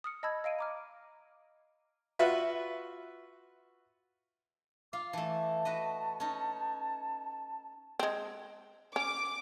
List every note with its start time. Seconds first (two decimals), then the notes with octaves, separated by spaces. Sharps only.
0.04 D#6 F6 C#7
0.23 D#5 A5 B5 E6 G#6
0.44 D#5 F5 D7 D#7
0.59 A#5 D6 F6
2.19 F4 F#4 B4 E5
4.93 F4 F5 D6
5.13 E3 A3 A5
5.65 F#4 B4 D#5
6.20 C#4 D#4
7.99 G#3 C4
8.96 C#4 D6